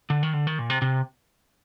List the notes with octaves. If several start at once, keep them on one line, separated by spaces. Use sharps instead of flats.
D3
D#3
D3
D#3
A#2
C3
C3